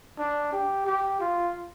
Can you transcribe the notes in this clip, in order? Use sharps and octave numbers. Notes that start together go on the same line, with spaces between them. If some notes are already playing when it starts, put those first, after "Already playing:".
D4
G4
G4
F4